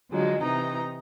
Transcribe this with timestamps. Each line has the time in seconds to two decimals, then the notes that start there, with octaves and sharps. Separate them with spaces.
0.12 D3 F3 F#3 G#3
0.42 C3 E3 D#4 A#5